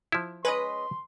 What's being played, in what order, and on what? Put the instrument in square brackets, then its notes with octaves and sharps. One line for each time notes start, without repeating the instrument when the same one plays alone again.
[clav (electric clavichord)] F3 E4
[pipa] G#3 C#4 D#5 [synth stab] B4 [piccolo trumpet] C6